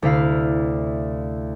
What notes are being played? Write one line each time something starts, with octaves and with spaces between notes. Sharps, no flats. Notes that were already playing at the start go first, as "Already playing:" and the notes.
D2 C3 E4 F5